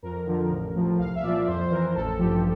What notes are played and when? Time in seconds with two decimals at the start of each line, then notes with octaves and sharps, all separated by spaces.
0.03 F2 A#4
0.26 D3 F3
0.50 A1
0.74 A2 F3
0.99 C2 F5
1.15 E5
1.23 A#2 F3 D5
1.47 F2 C5
1.61 C5
1.71 E3 A#4
1.95 A1 A4
2.19 G2 F3 G4